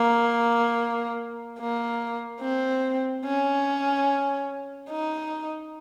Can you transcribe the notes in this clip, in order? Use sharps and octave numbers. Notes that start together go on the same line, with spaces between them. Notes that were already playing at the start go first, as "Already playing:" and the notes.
Already playing: A#3
A#3
C4
C#4
D#4